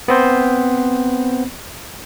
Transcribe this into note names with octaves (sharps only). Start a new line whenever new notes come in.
B3 C4 C5